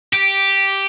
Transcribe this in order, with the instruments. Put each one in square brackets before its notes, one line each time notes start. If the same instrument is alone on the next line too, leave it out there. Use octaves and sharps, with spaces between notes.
[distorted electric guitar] G4